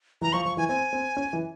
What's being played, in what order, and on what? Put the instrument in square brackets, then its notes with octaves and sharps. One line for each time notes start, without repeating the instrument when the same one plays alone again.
[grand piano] E3 [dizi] A#5
[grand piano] F3 [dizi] C#6
[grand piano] F3 [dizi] C#6
[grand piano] E3 [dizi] G#5
[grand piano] C4 [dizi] G#5
[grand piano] C4
C#4
E3